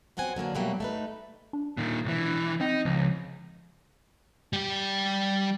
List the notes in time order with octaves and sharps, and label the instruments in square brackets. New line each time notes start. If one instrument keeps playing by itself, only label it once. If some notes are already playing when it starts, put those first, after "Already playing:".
[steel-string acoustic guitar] F#2 B3 C4 F#5 G#5
D3 F#3 A#3 D4
B2 F#3 G3 A3 A#3
A3 D#4 B4
[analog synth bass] D4
[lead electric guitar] A#2 D#3
B1 E3
[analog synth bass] C4 [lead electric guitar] D#4
[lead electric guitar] C#2 [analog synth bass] F3
[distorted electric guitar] G3 G4